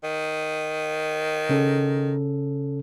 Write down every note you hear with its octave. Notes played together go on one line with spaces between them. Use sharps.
D#3
C#3 C#4 A4